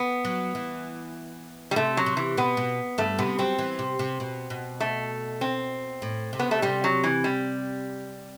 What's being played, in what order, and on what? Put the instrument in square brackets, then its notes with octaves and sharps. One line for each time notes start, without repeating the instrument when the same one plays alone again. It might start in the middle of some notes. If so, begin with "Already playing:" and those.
Already playing: [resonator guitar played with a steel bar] B3
[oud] F#3
E3
[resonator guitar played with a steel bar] G3
[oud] C3 [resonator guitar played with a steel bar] A3
[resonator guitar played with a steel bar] F#3
[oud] C3
[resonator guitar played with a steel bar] E3
[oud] B2 [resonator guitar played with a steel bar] B3
[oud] B2
[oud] G2 [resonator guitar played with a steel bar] A3
[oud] C3 [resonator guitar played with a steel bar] B3
[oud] F#3 [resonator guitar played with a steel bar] C4
[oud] E3
C3
C3
B2
B2
[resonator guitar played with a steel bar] A3
C4
[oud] A2
C3
[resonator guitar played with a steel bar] B3
A3
[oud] C3 [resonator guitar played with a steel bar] G3
[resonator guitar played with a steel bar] F#3
E3
G3